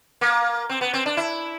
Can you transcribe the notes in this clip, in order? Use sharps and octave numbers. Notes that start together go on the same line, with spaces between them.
A#3
C4
B3
C4
D4
E4